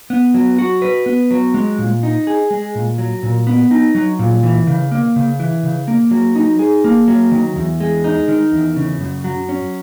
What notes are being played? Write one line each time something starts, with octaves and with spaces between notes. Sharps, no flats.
B3
F#3
F#4
B4
B3
F#3
G#3
A#2
D#4
G#4
G#3
A#2
F#3
A#2
B3
D#4
F#3
A#2
E3
C#3
A#3
C#3
E3
C#3
A#3
F#3
D#4
G#4
A#3
F#3
D#3
E2
G#3
D#4
D#3
E2
C#3
F#2
F#3
C#4